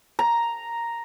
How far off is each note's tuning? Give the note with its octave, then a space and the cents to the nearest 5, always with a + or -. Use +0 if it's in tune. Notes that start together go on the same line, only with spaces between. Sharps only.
A#5 +0